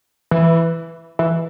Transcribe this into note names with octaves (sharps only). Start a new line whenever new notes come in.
E3
E3